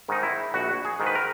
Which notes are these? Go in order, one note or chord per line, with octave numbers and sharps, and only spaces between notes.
G#2 D#3 D#4
E4
A#1 F#4
G#4
G#2 D#3
B4
A#4